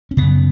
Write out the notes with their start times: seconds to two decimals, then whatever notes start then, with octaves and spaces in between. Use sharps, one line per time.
0.11 C#4
0.17 F#2 C#3 B3